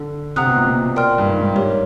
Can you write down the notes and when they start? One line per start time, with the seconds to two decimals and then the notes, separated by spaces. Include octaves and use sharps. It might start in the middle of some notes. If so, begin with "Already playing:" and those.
Already playing: D3
0.36 C3 F#5 A#5 D#6 F#6
0.47 B2
0.56 A#2
0.67 A#2
0.96 A#4 D5 G5 C6 F6
1.18 G2
1.26 G#2
1.41 G#2
1.56 G#2 G4 A#4 C#5